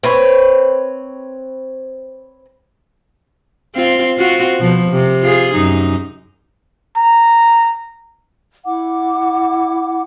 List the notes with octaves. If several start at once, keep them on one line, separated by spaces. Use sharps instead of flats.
C4 B4 C#5
C4 F4
C4 F4 F#4
B2 F3
C3
F4 G#4
F#2 D#4
A#5
E4 F#5 D6